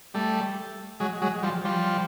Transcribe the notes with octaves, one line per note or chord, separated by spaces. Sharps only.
G3 A3
F#3 G#3
F#3 G#3
F3 G3
F3 G3